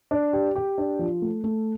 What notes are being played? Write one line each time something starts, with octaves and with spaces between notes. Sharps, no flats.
D4
G4
G4
D4
F3
A3
A3